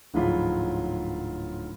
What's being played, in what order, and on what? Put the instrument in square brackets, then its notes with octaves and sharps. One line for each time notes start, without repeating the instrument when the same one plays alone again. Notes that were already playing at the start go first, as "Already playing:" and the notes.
[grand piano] D1 G#2 F3 F#3 F4 B5